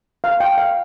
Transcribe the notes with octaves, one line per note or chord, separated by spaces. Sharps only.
F5
G5
F5